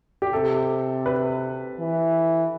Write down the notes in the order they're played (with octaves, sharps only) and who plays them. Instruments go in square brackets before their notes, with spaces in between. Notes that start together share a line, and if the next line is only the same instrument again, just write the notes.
[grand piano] G4
[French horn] C3 [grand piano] A4
[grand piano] B4
[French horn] E3